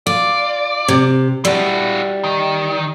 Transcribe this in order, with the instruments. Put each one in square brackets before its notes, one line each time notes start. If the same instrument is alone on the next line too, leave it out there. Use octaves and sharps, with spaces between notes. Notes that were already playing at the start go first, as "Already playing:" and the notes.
[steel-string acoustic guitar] F4 [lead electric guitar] D5
[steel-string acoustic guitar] C3
[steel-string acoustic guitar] G3 [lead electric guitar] E4 F#4
[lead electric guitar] D#3